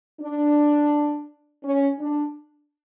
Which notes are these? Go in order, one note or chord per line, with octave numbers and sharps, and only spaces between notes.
D4
C#4
D4